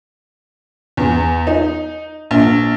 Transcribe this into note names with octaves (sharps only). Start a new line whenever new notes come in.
E2
D#4
A#1